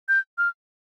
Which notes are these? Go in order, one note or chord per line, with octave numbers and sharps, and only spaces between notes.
G6
F6